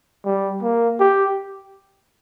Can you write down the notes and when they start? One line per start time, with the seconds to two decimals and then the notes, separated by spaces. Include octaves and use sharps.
0.25 G3
0.62 A#3
1.00 G4